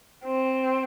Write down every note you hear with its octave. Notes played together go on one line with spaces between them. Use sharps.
C4